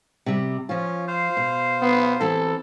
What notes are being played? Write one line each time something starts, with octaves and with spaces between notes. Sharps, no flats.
C3 G3
F3 C#4 F4
C5 F5
B2
B3
E3 C4 A4